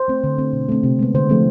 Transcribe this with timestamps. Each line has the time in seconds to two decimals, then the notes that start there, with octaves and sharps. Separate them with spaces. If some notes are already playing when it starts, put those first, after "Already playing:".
Already playing: C5
0.08 A3 C4
0.24 D3
0.38 A3 C4
0.53 B2
0.69 A3 C4
0.83 C3
0.99 G#3 B3
1.15 D3 C5
1.29 F3 A3 C4